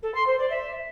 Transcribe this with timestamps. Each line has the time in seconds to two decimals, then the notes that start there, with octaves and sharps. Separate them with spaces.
0.02 A4
0.14 C6
0.26 C5
0.38 D5
0.50 E5